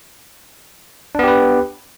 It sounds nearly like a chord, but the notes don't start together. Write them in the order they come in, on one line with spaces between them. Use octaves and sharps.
D4 B3 G4 B4